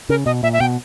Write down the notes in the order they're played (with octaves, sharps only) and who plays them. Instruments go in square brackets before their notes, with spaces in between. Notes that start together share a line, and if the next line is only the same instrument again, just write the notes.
[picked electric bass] C#3 [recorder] A#4
[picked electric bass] B2 [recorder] D#5
[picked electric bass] A#2 [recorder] E5
[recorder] E5
[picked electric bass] B2 [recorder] G5